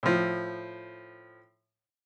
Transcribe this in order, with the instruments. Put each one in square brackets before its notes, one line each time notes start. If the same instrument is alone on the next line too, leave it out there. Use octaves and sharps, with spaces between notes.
[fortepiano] A2 F3